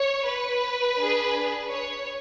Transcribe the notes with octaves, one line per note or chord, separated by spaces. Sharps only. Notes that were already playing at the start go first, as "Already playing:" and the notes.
Already playing: C#5
B4
D4 G#4
C#5